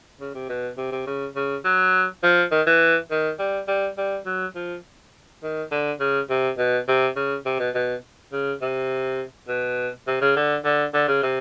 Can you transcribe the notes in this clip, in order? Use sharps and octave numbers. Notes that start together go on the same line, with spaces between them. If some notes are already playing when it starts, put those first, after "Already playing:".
C#3
C3
B2
C3
C3
C#3
C#3
F#3
F3
D#3
E3
D#3
G3
G3
G3
F#3
F3
D#3
D3
C#3
C3
B2
C3
C#3
C3
B2
B2
C#3
C3
B2
C3
C#3
D3
D3
D3
C#3
C3